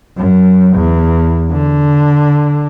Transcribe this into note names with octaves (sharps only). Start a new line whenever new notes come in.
F#2
E2
D3